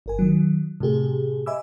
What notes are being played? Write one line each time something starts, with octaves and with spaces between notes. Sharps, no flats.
G1 A#4 G#5
D#3 F#3
A2 C3 G4 G#4
D#5 E5 G#5 B5 D6 E6